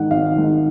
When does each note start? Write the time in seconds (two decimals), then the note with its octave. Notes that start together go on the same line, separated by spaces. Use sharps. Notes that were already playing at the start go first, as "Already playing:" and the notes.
Already playing: G#2 D#3 F#5
0.11 G#1 F5
0.35 G#2 D#3